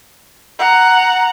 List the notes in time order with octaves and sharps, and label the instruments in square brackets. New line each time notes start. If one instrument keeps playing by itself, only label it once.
[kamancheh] F#5 A#5